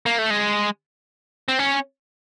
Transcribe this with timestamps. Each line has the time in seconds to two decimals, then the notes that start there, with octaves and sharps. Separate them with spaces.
0.06 A#3
0.18 A3
0.30 G#3
1.48 C4
1.59 C#4